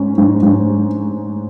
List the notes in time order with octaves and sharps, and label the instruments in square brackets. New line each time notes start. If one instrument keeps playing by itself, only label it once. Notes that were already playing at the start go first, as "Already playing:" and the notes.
Already playing: [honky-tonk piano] G#2 C#4
G#2
G#2